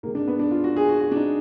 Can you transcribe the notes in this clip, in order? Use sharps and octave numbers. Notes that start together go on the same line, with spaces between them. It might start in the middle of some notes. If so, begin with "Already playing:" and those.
G#2 D#3 A#3
D4
B3
D4
F4
F#4
G#4
F#4
F#4
D4
D#4